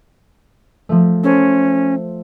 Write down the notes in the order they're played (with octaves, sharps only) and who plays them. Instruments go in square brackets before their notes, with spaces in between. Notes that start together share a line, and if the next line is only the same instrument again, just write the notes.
[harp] F3 A3
[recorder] C#4 [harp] A4 C5